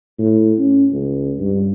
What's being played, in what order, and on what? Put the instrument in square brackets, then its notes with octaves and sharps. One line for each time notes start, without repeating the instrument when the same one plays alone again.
[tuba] A2
C#4
C#2
G2